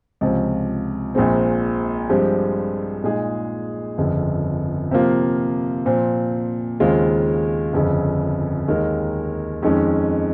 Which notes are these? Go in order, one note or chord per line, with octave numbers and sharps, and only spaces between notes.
C#2 C3 F3
A#1 A#2 G#3 C4
G2 F3 G#3 C4 G4
A#2 G#3 D#4 G#4
G1 F2 C#3
C3 F3 A#3 F4
A#2 F3 C4
D#2 C#3 G#3 C4 F4
G1 F2 C#3
D#2 D#3 G#3 D#4 A#4
F2 D#3 G#3 C#4